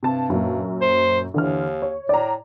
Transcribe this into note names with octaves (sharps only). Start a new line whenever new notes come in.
G2 C3 A5
F#2 A#2
C5
D#2 D3 E3 F6
C#5
A2 D5 A#5